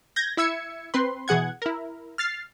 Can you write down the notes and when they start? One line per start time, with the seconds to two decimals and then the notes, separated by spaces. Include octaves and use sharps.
0.16 G6 G#6 A#6
0.37 E4 E5 E6 G#6 C#7
0.94 C4 B4 C6
1.28 B2 E3 G#4 F#5 G#6
1.62 E4 A#4
2.18 F6 A6 C7